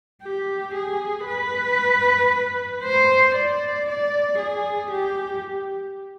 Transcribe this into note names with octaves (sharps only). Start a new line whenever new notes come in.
G4
G#4
B4
C5
D5
D5
G#4
G4